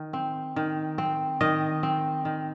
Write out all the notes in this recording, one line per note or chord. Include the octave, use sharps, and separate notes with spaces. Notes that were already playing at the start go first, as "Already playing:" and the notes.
Already playing: D#3
C4
D#3
C4
D#3 D#5
C4
D#3